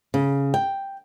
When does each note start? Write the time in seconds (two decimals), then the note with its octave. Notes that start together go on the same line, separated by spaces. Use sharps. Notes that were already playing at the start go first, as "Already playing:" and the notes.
0.14 C#3
0.54 G5